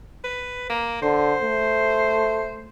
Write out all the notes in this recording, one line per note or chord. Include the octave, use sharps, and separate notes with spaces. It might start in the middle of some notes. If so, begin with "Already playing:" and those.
B4
A#3
D3 C5
A3